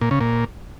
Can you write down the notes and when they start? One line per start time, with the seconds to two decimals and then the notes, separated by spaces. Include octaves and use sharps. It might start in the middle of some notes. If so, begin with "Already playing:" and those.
0.01 A#2
0.11 C#3
0.21 A#2